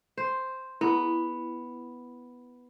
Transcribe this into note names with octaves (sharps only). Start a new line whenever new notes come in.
C5
B3 E4 G#4